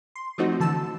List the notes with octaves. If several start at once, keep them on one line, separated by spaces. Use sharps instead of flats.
C6
F3 F#3 A3 C4 D#4 F#4
D3 E3 A5 E6